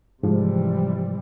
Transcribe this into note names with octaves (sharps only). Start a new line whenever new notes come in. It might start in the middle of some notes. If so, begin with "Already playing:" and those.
G#2 C3 E3 F3 G3